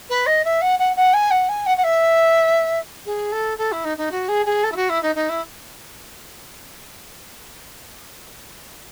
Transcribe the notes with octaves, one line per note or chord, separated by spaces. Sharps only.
B4
D#5
E5
F#5
F#5
F#5
G#5
F#5
G#5
F#5
F#5
E5
G#4
A4
A4
E4
D#4
D#4
F#4
G#4
G#4
A4
E4
F#4
E4
D#4
D#4
E4